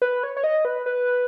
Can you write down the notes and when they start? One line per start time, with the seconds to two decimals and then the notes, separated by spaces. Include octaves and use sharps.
0.02 B4
0.23 C#5
0.37 C#5
0.44 D#5
0.65 B4
0.86 B4